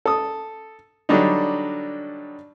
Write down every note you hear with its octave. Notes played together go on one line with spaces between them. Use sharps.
A4 D#6
D3 F#3 G3 D4 D#4